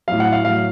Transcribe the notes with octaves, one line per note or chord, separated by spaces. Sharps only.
A2 F#3 F5
F#5
F5
A2 F#3 F5